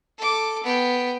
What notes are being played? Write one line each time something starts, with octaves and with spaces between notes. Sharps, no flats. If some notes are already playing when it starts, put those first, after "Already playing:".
A4 D6
B3 G5